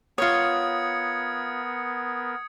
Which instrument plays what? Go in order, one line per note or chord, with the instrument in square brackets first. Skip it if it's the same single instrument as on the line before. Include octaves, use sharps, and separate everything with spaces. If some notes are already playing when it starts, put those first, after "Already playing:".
[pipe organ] B3 A#4 [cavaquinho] F4 C#5 [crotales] D#6 G#6 C#7